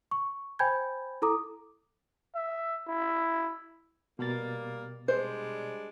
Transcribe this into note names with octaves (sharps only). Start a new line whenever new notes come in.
C#6
C5 G5 G#5 B5 G6 G#6
E4 A4 A#5 D6 D#6
E5
E4
B2 G3 A#3 A6
G3 G#3 D4 C5